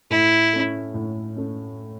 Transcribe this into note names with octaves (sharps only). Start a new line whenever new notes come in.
A2 E4
A3 C#4
A2
A3 C#4